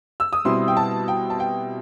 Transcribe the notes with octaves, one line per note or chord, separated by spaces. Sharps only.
E6
D#6
B2 G3 C4 E4 C6
G5
A5
G5
A5
G5